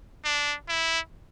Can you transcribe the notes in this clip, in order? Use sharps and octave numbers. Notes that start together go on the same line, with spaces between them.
D4
E4